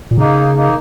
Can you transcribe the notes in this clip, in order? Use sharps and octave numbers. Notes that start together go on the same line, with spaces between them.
A#2
C#3 A#3 D#4
A#3 D#4